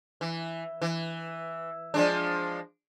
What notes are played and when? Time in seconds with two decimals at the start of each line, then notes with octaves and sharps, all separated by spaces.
0.21 E3
0.81 E3
1.94 F3 G#3 D4